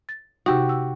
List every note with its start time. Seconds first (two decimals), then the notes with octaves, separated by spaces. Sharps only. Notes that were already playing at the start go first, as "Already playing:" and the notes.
0.09 A6
0.46 C3 D#4 F#4 G4
0.69 E6